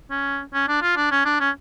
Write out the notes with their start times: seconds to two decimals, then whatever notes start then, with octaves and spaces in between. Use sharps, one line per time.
0.10 C#4
0.54 C#4
0.68 D4
0.82 F4
0.97 D4
1.11 C#4
1.25 D4
1.40 C#4